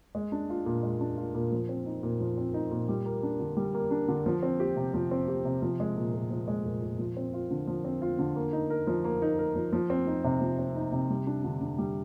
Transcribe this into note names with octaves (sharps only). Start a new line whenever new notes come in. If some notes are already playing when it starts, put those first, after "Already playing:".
G#3
D4
F4
A#2
G#3
D4
F4
A#2
F3
C4
D#4
A#2
F3
C4
D#4
A#2
G3
A#3
D4
D3
G3
A#3
D4
D3
F3
C4
G4
C3
F3
C4
G4
C3
F3
G#3
A#2
A#2
F3
G#3
A#2
A#2
F3
C4
F4
D3
F3
C4
F4
D3
A#3
D#4
A#4
F3
A#3
D#4
A#4
F3
F3
C4
D#4
C3
F3
C4
D#4
C3
G3
D4
D3
D3
G3